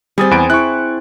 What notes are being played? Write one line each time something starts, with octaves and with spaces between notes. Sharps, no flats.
G3 C4 G#4 D#6 A6
E2 B5 D7
E4 C#6 F#6